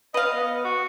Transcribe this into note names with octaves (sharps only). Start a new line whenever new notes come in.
B4 D#5 F5
B3
F#4